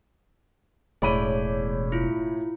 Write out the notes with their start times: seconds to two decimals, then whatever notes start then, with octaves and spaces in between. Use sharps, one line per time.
1.02 E1 A2 G#4 C#5 D5 B5 D#7
1.92 E4 F4